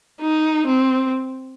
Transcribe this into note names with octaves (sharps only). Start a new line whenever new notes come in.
D#4
C4